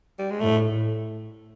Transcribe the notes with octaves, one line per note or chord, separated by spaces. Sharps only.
G3
G#3
A2 A3